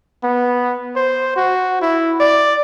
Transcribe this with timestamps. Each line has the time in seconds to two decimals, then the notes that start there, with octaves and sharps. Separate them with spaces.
0.24 B3
0.96 C5
1.36 F#4
1.81 E4
2.20 D5